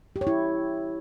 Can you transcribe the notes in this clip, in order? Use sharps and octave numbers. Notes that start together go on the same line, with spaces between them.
G4
C#5
E4